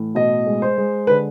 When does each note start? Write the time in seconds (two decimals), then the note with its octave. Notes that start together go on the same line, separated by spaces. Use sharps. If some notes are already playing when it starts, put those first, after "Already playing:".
Already playing: A2 E3
0.15 B2 D#5
0.46 G#3
0.62 C5
0.78 G#3
1.07 D3 B4